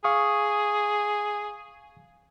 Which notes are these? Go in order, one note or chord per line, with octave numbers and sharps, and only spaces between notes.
G#4 F5 C#6 D#6